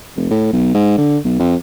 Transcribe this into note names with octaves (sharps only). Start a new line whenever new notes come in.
F1
A2
B1
G#2
D3
B1
F2